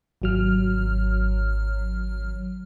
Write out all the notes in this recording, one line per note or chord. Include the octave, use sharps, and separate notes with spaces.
G#1 F#3 F6